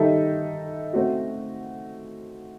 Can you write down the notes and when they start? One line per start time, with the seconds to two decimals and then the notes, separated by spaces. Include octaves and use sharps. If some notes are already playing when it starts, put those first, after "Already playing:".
Already playing: D#3 G3 D#4 A4 E5
0.93 A3 C4 F#4